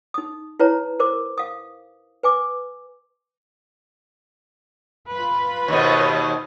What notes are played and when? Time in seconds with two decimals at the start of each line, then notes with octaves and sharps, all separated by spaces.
0.14 D#4 D#6
0.59 E4 B4 C#5 A#5
1.00 A#4 C5 D6
1.38 F5 D#6
2.23 B4 G#5 D6
5.11 F4 B4
5.68 D#2 B2 C5 C#5 D#5